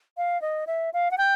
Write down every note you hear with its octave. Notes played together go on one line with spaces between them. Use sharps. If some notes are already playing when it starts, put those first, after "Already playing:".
F5
D#5
E5
F5
F#5
G5